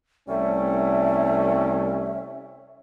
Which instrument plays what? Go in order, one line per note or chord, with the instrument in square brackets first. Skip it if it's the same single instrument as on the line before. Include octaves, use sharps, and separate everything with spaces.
[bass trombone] C2 [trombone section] G3 A3 C#4 [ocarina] E5